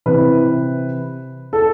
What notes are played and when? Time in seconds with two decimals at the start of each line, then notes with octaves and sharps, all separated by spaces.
0.06 C3 E3 B4
1.53 A4